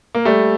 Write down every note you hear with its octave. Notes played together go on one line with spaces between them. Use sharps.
A#3
G3 A3